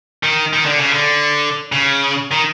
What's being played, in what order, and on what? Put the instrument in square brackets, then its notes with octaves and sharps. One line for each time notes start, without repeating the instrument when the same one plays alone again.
[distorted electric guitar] D#3
D#3
D3
C#3
D3
C#3
D#3